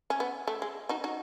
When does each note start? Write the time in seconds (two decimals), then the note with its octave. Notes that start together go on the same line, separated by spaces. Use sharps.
0.10 C#4
0.20 B3
0.48 A3
0.62 G#3
0.89 D#4 F#4
1.04 D#4 F#4